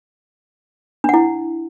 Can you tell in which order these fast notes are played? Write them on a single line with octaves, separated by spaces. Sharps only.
D4 F#5 E4